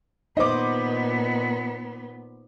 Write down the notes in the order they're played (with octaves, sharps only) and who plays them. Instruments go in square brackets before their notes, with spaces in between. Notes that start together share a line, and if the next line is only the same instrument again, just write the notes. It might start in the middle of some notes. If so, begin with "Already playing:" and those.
[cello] A#2 B3 [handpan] D#4 C5 [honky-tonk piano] D#5 D6